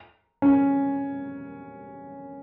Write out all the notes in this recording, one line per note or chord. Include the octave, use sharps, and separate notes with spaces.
C#4